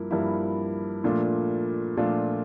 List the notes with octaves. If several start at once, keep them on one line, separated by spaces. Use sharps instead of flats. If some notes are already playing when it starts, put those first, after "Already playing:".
Already playing: G2 F3 A#3 E4
G2 F3 A#3 E4
A#2 F3 A3 D4 F4
A#2 F3 A3 D4 F4